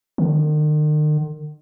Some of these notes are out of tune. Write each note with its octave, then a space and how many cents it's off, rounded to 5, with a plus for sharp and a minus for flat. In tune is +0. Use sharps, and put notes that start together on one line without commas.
D#3 -45